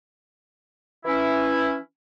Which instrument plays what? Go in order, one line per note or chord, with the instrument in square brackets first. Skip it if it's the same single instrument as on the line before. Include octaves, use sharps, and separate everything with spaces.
[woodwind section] E3 C#4 E4